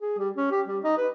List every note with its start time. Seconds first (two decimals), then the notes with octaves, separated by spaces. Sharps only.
0.01 G#4
0.18 G3
0.36 C#4
0.51 G4
0.68 G3
0.84 D#4
0.97 B4